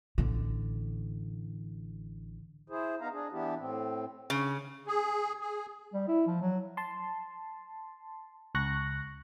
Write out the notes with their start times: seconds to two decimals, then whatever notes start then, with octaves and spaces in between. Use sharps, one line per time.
0.18 A1 D3
2.70 E4 G#4 C5
3.01 B3 D#4 F5 A#5
3.12 D4 G#4
3.32 E3 B3 D4 E4 G4
3.58 A2 C4
4.30 C#3
4.87 G#4
5.41 G#4
5.94 G3
6.08 E4
6.27 F3
6.42 F#3
6.77 A5 C6
8.55 C#2 C#6 F#6 A#6